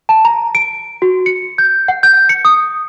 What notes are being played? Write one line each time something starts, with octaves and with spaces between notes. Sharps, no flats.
A5
A#5
D7
F#4
C#7
G6
F#5
G6
C#7
D#6